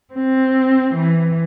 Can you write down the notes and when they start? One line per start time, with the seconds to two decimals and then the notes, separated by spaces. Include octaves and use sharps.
0.14 C4
0.95 E3